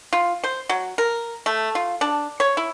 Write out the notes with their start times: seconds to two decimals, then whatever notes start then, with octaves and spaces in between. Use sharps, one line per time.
0.13 F4
0.44 C5
0.69 F#3
0.98 A#4
1.46 A3
1.75 F4
2.01 D4
2.40 C#5
2.57 E4